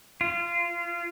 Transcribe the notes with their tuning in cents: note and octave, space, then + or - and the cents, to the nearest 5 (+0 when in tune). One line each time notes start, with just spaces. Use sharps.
F4 -25